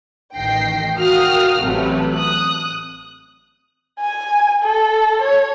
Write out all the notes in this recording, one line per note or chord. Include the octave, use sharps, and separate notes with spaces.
A1 D#3 G5 A#6 C7
F#4 A#4 F5 G5 D#6 F6
A1 C3 F#3 A3 B4
D#6 F#6
G#5
A4
C#5